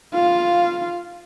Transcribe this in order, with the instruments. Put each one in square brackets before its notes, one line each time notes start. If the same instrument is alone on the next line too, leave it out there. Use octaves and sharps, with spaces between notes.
[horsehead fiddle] F4 F5